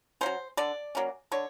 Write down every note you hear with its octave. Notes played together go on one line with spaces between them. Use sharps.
F#3 A#3 C#4 C5
D3 D5
F#3 A#3 C#4
D3 C#5